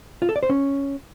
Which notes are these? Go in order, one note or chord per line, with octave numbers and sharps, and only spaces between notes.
F4
A4
D5
C5
C#4